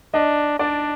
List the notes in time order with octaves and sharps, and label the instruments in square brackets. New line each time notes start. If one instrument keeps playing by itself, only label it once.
[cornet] D4 [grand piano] D#5
[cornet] D4 [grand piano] D5